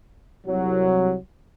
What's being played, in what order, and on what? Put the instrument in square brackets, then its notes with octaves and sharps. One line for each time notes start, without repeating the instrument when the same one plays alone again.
[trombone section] C2 F#3